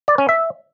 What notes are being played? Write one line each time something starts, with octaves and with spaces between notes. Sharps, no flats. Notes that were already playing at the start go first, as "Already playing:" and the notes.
D5
C#4
E5